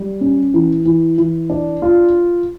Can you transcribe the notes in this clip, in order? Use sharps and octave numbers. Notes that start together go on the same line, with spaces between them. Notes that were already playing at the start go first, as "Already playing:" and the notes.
Already playing: G3
C#4
E3
E3
E3
D4
F4